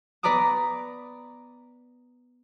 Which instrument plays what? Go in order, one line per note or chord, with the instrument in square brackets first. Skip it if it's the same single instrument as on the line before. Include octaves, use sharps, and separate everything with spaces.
[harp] B3 B4 D5 A#5 D6 D#6